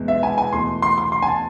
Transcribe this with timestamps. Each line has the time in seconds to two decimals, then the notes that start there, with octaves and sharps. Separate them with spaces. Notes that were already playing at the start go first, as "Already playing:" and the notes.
Already playing: E2 B2 G#3
0.08 E5
0.23 G#5
0.38 G#5
0.53 E2 B2 A3 C6
0.82 C6
0.98 C6
1.12 C6
1.23 G#5
1.27 A5